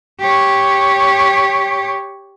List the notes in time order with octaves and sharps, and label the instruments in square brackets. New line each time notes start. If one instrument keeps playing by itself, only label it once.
[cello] G4 C#5